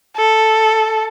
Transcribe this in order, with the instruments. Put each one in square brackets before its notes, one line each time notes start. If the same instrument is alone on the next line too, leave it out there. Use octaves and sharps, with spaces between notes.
[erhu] A4